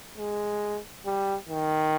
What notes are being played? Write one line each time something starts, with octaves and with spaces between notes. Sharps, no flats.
G#3
G3
D#3